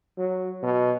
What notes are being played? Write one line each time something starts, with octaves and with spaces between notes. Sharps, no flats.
F#3
B2